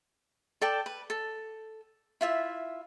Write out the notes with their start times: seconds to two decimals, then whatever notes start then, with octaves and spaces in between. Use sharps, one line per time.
0.61 A4 D5 G5 A5
0.86 B4
1.10 A4
2.21 E4 F4 E5